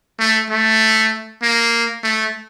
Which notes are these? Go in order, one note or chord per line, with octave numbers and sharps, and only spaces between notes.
A3
A3
A#3
A3